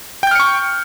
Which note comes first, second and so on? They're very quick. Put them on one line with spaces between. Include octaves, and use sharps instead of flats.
G5 G6 F6 C#7 C#6